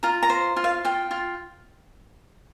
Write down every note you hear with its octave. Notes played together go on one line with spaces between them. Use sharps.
F4 A#5
A#5
C5
F4
F5
F4 G5
F4